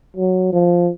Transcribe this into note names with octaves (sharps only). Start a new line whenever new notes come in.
F#3
F3